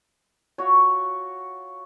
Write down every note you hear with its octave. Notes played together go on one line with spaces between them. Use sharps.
F4 F#4 C#5